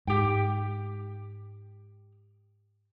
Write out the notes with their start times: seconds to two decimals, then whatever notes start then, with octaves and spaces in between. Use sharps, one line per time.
0.07 G#2 G4 G5